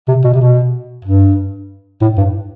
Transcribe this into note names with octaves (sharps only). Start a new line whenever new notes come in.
C3
B2
C3
B2
G2
A2
G2